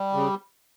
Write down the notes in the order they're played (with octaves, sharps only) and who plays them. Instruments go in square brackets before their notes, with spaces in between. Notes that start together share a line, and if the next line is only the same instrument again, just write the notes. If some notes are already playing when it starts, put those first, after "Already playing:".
Already playing: [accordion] G3
C#3